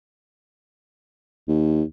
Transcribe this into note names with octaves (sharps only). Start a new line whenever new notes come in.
D#2